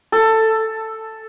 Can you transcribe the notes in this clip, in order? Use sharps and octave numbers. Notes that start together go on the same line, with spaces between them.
A4